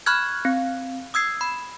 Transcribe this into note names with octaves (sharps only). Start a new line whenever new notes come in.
B5 C#6 F6 F#6 G#6
C4
D#6 E6 G#6 C7
B5